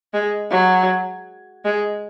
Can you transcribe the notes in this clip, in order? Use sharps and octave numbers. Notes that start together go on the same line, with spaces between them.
G#3
F#3
G#3